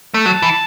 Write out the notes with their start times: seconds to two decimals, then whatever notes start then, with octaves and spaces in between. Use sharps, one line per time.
0.14 A3
0.26 F#3 A5
0.42 E3